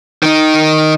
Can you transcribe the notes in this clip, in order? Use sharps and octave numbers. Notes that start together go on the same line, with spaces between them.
D#3 D#4